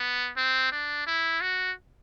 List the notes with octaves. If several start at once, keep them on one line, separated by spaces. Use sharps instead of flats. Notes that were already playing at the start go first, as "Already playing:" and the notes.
Already playing: B3
C4
D4
E4
F#4